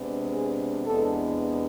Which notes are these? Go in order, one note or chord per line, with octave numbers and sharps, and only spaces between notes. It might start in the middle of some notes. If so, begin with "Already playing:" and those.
Already playing: C3 G#3 B3 D4
G#4
E2 C3 G#3 B3 D4 A4